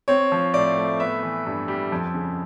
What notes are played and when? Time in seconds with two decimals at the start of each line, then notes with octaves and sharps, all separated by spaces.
0.08 C4 C#5
0.32 F3
0.53 A2 D5
0.78 A3
1.00 B3 E5
1.23 E3
1.46 G2
1.68 G3
1.92 F2
2.14 C#3